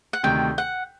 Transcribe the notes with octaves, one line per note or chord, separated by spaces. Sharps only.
F#5
D2 C3 D#3 G5
F#5